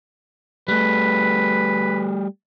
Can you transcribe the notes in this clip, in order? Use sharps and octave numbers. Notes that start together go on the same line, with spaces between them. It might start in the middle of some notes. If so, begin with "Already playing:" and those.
G3 A3 B4